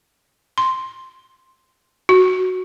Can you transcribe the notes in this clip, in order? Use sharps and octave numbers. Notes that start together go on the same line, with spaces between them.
C6
F#4